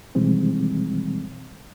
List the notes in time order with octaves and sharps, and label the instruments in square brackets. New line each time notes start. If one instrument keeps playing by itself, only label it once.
[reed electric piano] B2 D#3 E3 G3 G#3 C4